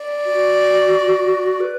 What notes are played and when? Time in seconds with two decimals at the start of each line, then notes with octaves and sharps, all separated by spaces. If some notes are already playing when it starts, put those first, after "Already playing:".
Already playing: D5
0.26 F#4
1.60 B4